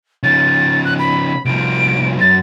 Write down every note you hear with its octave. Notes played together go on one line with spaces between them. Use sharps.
C#3 F3 A6
F#6
B5
C2 F3 D7
F#2 A6